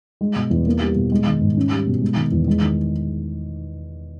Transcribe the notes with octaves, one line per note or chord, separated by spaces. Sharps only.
G#3
B2
E2
A#3
G3
B2
G#3
D#3
G#2
C#4
G3
B2
G#3
D#3
E2
G#3
D#3